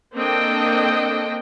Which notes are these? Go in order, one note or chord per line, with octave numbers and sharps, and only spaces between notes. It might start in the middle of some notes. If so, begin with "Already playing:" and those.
A#3 C4 D4 A4 D#5 G5